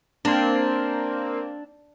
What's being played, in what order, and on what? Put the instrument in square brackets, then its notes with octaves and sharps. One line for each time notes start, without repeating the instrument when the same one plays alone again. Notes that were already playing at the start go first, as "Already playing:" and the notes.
[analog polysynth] A#3 C4 [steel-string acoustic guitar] D4